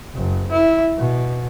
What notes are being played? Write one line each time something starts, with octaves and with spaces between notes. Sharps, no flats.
F#1
E4
B2